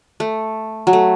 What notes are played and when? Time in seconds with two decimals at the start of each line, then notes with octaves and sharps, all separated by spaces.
0.20 A3
0.87 F#3
0.93 A3